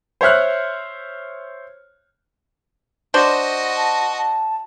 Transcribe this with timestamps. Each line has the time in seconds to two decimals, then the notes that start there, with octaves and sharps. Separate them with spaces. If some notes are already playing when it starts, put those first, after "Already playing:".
0.21 C5 C#5 E5 F6 F#6
3.14 D4 F#4 C5 D#5
3.77 A5
4.18 A5